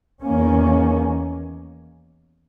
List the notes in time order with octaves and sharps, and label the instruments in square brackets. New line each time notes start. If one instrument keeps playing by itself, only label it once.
[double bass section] E2 D#3 A#3 C#4